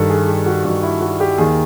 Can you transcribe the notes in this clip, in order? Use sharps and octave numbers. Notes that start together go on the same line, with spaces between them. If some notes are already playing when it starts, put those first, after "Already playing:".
Already playing: G2 D#3 A4
G#4
G4
F#4
G2 D#3 F#4
E4
F#4
G4
D#2 D#3 G#4